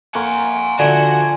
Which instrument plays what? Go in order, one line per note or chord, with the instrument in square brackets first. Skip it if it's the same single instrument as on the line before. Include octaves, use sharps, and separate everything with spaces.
[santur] A#3 C6 C#6 [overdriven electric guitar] F#5 G#5
[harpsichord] D3 [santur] F3 E5 [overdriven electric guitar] F#4 [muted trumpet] G#5